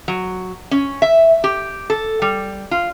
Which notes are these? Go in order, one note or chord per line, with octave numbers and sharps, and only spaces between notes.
F#3
C#4
E5
G4
A4
G3
F4